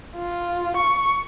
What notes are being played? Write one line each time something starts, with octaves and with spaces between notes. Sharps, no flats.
F4
C#6